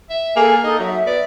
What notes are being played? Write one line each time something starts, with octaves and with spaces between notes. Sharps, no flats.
E5
A#3 G#4 A4 G#5
D#4 A4 D#5 D#6
F#3 F#4 E5
B3 D5